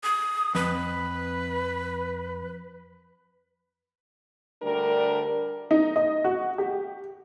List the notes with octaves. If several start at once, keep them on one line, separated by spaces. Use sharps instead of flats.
D#6
F2 B4
D2 G3 D4 A#4
D#4
D#5
F#4
G4